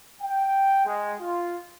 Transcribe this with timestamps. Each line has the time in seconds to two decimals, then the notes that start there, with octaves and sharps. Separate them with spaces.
0.22 G5
0.86 G#3
1.20 F4